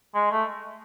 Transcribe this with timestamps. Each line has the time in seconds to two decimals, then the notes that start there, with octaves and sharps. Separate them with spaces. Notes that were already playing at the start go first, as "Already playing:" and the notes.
0.15 G#3
0.32 A3